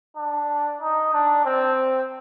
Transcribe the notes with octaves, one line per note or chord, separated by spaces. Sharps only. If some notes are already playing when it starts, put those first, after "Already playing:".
D4
D#4
D4
C4